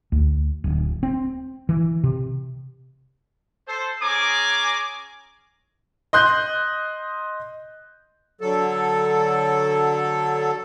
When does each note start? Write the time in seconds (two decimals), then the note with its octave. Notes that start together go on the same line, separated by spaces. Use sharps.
0.12 D2
0.64 D1
1.03 C4
1.69 E3
2.04 C3
3.67 A4 C5
4.02 C#4 G#4 G#5 A#5 D6
6.13 D#5 C6 F#6 G6
8.41 D3 F#3 A4